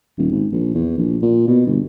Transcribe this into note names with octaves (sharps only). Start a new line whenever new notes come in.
D#1
G#1
A#1
E2
A#1
A#2
B2
G1